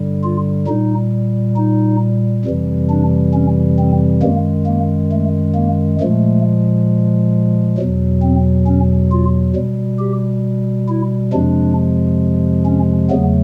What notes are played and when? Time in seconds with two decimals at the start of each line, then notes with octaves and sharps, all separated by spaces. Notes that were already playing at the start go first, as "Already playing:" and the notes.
Already playing: G2 D3 G3
0.23 F4
0.68 A#2 G3 D#4
1.56 D#4
2.45 F2 C3 E3 G3
2.90 D4
3.34 C#4
3.78 C4
4.22 F#2 D#3 G#3 A#3
4.67 A#3
5.12 A3
5.55 A#3
6.00 A#2 F3 G#3 A3
7.78 E2 B2 F#3
8.22 C4
8.67 C#4
9.11 F4
9.55 B2 G3
9.99 G4
10.89 E4
11.33 F2 C3 F3 G#3 D4
12.66 C#4
13.10 E2 C#3 F#3 A3 B3